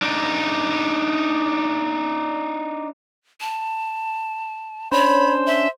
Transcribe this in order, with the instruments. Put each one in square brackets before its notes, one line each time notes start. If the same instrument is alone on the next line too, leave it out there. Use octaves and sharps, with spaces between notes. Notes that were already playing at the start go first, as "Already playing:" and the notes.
[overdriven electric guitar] D4 D#4
[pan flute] A5
[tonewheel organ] C#4 D4 E6 [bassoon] C5 [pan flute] C#5 [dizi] B5
[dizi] E5 [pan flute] C6